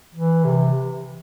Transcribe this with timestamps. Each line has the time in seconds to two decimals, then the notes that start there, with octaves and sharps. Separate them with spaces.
0.15 E3
0.44 C3